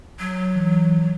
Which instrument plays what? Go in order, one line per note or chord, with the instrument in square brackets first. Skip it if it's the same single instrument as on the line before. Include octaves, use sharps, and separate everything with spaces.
[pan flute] F#3
[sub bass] E3